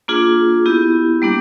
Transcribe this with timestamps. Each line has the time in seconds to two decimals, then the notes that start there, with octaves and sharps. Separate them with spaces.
0.08 A#3 D4 F4 G#4
0.66 B3 E4 G4
1.22 G3 A#3 D4 G4